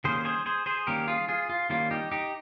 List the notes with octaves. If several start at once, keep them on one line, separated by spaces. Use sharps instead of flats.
D#3 G3 A#3 C#4 G#4 C5
G#4 C5
G#4 C5
G#4 C5
D#3 G3 A#3 C#4 G4 A#4
F4 G#4
F4 G#4
F4
D#3 G3 A#3 C#4 F4
D#4 G4
D#4 G4